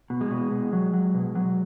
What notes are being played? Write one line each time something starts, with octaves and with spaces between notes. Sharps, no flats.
B2
G#3
B2
B2
F#3
F#3
B2
F#3